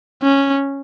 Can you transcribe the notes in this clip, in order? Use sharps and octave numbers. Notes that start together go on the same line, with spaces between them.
C#4